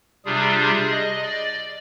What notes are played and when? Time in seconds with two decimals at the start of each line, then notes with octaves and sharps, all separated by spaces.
0.25 C3 G3 D4 F4 G#4
0.90 D#5
1.22 D5